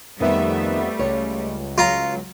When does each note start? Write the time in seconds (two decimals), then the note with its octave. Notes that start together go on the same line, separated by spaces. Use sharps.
0.20 F2 D#3 G3 A3 B3 C4 E5
0.99 C#2 C#5
1.78 F#3 F4 A#5